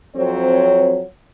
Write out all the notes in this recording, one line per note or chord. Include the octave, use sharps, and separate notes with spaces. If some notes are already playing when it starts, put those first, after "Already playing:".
F2 F#3 C4 C5 C#5